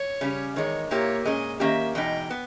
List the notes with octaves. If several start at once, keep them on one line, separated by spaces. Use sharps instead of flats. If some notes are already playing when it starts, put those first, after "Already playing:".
Already playing: C#5
C#3 G3 C#4
E2 D#3 G#3 C#5
A#2 A#3 E4 G4 C#5
A#2 G#3 C#4 D#5
D#3 A#3 C#4 G4 E5
E2 B2 G#3 D#4 G5
B3